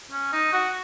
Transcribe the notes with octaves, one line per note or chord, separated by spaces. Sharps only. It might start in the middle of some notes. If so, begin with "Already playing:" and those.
C#4
D#4
F#4